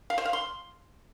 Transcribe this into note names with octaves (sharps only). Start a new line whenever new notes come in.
F5
C5
F5
C6